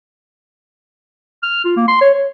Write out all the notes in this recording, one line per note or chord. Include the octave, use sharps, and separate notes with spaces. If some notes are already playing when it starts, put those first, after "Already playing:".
F6
F4
A#3
C6
C#5
C#5